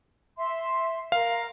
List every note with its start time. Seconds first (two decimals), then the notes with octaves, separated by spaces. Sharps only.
0.38 E5 C6
1.12 A#4 F5